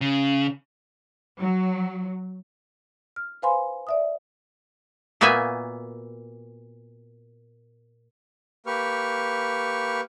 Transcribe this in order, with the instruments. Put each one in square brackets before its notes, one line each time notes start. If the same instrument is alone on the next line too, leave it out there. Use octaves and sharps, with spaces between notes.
[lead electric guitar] C#3
[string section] F#3
[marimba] F6
B4 C5 F5 G#5 B5 C6
D5 E5 D#6
[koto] A#2 A#3 B3 F#4 E5 G#5
[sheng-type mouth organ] A#3 G4 B4 C#6 F6